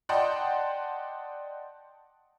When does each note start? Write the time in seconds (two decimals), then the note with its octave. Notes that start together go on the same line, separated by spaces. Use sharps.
0.09 D5 D#5 F#5 G5 A5 C6